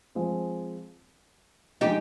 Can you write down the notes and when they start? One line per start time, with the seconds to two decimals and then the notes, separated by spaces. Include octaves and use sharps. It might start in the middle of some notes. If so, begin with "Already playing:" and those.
0.15 F3 G#3 C4
1.81 D3 F3 G#3 D#4 G4